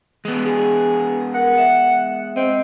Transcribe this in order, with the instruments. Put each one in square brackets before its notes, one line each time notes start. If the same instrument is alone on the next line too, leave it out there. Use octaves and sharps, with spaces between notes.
[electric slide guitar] G#3 B3
[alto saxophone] G#4
[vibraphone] A#4 [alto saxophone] F#5
[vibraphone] E5
[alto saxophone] C4 [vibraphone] D#5